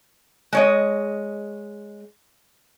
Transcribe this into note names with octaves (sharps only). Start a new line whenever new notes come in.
G#3 C#5 D#5